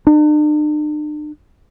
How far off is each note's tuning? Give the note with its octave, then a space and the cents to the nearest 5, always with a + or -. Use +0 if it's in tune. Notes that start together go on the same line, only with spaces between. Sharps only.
D4 +45